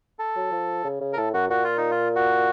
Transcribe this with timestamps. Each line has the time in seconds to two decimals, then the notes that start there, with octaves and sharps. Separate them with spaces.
0.19 A4
0.36 F#3
0.52 F3
0.85 C#3
1.01 C#3
1.13 A#4
1.17 A2 A4
1.34 F#2 F#4
1.50 A#2 F#4
1.64 F4
1.77 D#4
1.91 F4
2.16 F#4